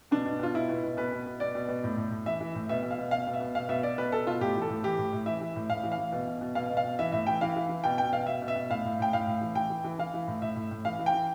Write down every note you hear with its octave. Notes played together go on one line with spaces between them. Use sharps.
B2 D4
B2
B2 F4
B2 E4
B2
B2
B2 B4
B2
B2
B2 D5
B2
B2
A2
A2
A2
E3 E5
E3
A2
B2 E5
B2
F5
B2
B2 F5
B2
E5
B2
B2 F5
B2 E5
B2 D5
B2 B4
B2 A4
B2 F4
A2 G4
E3
A4
A2
E3 G4
A2
A2
E3 E5
E3
A2
A2 F5
E3
F5
E3
B2
B2
B2
B2 F5
B2
F5
B2
E3 E5
A2 E5
E3 G5
E3 F5
E3
E3
B2 G5
B2 G5
B2 F5
B2 E5
B2
E5
B2
A2 F5
A2
A2 G5
A2 F5
A2
E3
E3 G5
E3
E3
E3 F5
E3
A2
A2 E5
A2
A2
E3 F5
E3
G5
E3